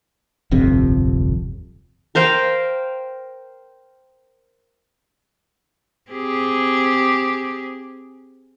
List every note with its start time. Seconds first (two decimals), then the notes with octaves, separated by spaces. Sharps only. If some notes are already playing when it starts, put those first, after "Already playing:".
0.51 D1 G1 F2 C3
2.15 A#4 C5 F5 G5
6.12 C4 G4 G#4